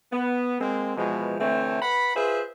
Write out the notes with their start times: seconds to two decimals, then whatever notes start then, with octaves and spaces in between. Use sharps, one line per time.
0.12 B3
0.60 G#3 A#3 C4
0.97 B2 E3 F3 G#3
1.39 D3 E3 A3 C4 C#5
1.82 B4 F#5 B5
2.16 F4 G#4 B4 C5 E5